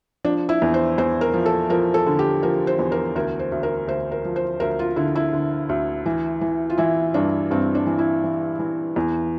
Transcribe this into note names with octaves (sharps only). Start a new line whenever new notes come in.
F3 D4
E4
E2
C5
E2 C5
A#4
F3
A4
F3 A#4
A4
D3
G4
F3 A#4
C5
E2
A#4
D2 A#4
C5
D2
A#4
D2 C5
A#4
F3
C5
D2 A#4
F4
D3 E4
E4
D3
D2
E3
E3
F4
E3 E4
G2 D4
G2 C4
D4
E3
E4
E3
E3
E2